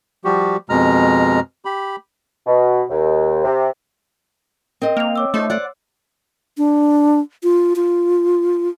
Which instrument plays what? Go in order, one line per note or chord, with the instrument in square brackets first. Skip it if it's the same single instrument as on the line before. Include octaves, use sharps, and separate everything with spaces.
[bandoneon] F3 G3 F#4 G4
F2 B2 G#3 A#5 F6
G4 B5
[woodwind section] B2
D#2
C3
[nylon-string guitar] C4 D#5 [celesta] A#4
[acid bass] A#3 [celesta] F6 F7
[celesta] C#5 D6 E6
[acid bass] A3 [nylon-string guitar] D#4 C5
[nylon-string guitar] C5 D5 F#5
[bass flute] D4
F4
F4